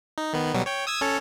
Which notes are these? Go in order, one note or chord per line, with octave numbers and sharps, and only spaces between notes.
D#4
D#3 B3
B2 F#3 G3
C#5 G5
D#6 E6 G#6
C#4 A4 C#5